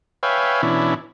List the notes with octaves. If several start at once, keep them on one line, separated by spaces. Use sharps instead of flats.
B4 C#5 E5 F5 G5 G#5
B2 E3 C#4 D4 E4